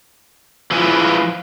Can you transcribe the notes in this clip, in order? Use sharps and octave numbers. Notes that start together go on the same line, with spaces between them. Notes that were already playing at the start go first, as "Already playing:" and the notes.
F3 E4 F4 G#4 B4 G#5